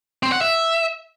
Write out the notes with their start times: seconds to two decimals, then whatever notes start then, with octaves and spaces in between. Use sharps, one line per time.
0.23 C4
0.32 F#5
0.41 E5